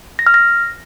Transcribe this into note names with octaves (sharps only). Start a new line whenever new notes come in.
A#6
F6
A#6